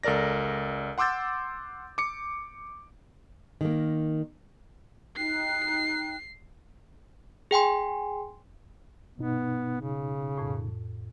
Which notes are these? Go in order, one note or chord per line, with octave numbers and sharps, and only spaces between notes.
C#2 A4 A#4 D5 A#6
F#5 C6 D6 E6 G6 A6
D6 C#7
D#3 A#3
D#4 G5 F#6 C7
G#4 G5 G#5 C6
G2 B2 B3 D#4
C#3
F2 A2